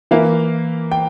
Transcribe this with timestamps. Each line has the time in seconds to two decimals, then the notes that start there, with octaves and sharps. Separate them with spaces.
0.11 E3 A#3 E4 F5
0.92 G5